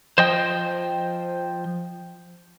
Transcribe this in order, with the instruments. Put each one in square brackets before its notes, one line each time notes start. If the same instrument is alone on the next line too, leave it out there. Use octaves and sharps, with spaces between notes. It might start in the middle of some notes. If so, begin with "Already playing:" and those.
[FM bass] F3 [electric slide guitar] C5 D#5 G5